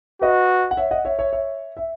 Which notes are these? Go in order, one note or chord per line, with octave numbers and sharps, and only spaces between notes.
F#4 B4 D#5
F#5
C#5 E5
D#5 F#5
C#5 E5
C#5 E5
C#5 E5
E5